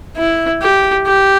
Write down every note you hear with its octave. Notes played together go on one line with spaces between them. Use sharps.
E4
G4
G4